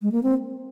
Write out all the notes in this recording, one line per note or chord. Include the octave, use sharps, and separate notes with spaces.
G#3
A#3
C4